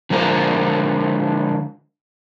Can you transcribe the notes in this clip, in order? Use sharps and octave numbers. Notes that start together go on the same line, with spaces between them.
D3 F3 G#3 A#4 C5